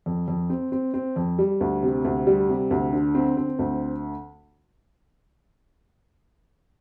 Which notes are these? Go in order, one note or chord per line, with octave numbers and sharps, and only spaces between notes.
F2
F2
C4
C4
C4
F2
G3
D2
C3
D2
G3
C3
D2
D3
C4
C4
D2